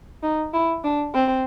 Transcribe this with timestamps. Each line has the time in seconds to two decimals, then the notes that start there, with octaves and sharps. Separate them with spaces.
0.23 D#4
0.54 E4
0.84 D4
1.14 C4